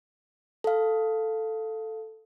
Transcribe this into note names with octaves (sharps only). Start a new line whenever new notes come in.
A4 F5